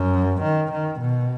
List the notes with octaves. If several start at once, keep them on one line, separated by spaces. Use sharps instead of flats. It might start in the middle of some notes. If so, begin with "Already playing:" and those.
Already playing: F#2
D#3
D#3
B2